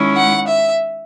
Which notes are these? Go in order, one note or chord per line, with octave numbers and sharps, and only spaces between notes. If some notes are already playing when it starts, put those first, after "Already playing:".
Already playing: D#3 G#3 C#4 E4
F#5
E5